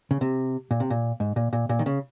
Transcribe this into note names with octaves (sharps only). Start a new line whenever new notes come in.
C#3
C3
A#2
C3
A#2
G#2
A#2
A#2
A#2
D#3
C#3